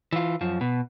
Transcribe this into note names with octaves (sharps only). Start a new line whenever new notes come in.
E3 F4
F#2 F3
B2